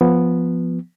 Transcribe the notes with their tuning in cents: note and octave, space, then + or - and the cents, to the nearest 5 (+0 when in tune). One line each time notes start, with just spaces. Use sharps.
F3 +0 B3 +0